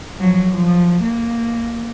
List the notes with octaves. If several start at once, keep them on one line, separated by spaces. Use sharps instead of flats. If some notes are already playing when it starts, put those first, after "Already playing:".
F3 F#3
F3
A#3